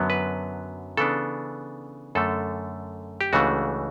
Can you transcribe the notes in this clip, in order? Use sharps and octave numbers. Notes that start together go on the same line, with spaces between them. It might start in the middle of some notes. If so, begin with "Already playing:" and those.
Already playing: F#2 D3 F#3 B3
B4
C#3 E3 B3 D4 A4
F#2 D3 A3 A4
G4
C#2 C#3 E3 A3 D4 F#4